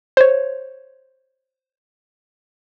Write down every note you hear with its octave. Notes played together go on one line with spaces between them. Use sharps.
C5 C#5